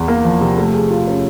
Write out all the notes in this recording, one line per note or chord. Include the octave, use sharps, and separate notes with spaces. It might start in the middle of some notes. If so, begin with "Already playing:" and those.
Already playing: E2
A#3
F3
C3
A3
G#4
F4
C#4